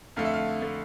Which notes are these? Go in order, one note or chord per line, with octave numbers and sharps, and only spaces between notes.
F2 D3 A3 F5
E5
F5
D3 A3